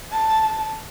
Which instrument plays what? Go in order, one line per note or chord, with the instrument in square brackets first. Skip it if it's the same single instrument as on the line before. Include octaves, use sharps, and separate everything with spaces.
[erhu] A5